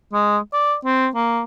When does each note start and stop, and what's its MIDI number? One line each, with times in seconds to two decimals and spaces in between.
0.13 0.38 56
0.53 0.74 74
0.85 1.08 60
1.15 1.42 58